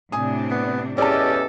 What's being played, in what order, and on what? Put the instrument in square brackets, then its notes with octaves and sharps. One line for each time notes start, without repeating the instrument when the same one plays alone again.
[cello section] A2 C3 D4 [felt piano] G#5 D#6
[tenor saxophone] B3
[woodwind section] E2 A4 [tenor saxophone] C#4 [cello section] G4 D#5 [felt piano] D5 A5